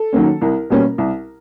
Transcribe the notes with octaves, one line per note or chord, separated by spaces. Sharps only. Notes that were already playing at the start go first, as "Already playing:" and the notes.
Already playing: A4
D#3 F#3 A#3 C#4
C2 A#4
B2 G3 A#3 C#4
C2